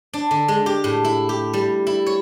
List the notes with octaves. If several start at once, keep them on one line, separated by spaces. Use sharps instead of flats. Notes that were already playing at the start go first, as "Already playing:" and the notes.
D4
D3
G#3
G4
A2
E4
G4
G3
E4
C#5